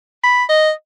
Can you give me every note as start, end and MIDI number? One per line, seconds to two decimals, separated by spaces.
0.24 0.44 83
0.49 0.71 75